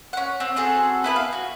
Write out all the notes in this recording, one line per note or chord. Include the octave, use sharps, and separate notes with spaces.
C#4 F#5
C4
C4 F#4 G#4 A4
B3 E4 B4
F5
F#4